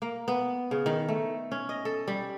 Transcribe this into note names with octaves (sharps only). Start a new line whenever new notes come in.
A#3
B3
C#3
D#3
A3
C#4
D#5
A4
G3